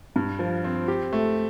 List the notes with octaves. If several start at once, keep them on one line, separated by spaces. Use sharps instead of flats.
G2
F3
C4
G4
A3